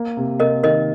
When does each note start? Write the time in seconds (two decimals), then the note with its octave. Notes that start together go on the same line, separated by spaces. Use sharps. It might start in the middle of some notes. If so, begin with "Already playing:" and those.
Already playing: A#3
0.17 C3
0.40 C3 A#4 D#5
0.63 D#3 A#4 D#5